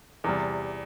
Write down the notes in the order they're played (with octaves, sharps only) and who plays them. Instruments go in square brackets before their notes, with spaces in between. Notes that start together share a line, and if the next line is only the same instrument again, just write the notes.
[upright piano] E2 C3 G3